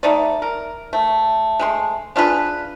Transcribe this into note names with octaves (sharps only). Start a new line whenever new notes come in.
G3 A3 D#4 D5
A#4
A3
G#3 A3 C6
D4 F4 G#4 B4